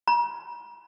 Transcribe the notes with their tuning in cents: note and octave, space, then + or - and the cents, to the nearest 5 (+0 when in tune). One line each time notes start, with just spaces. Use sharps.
A#5 +40